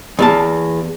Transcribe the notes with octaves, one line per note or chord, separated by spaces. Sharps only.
E2 A#3 A5